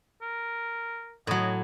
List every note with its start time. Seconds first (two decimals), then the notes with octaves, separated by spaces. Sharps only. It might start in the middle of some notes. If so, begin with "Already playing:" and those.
0.22 A#4
1.27 A2 F#3 D#5